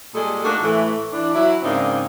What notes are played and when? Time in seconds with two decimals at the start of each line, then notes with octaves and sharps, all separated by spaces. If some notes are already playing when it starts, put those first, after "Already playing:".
0.14 A#2 G3 G#3 G#4 A4
0.44 A3 A#3 D4 D#4 F#4
0.62 A2 E3 A3
1.12 E3 D4
1.33 F#3 E4
1.63 G#2 C#3 A#3 C4 D4 D#4